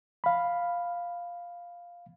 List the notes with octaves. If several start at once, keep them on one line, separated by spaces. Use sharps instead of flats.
F5 B5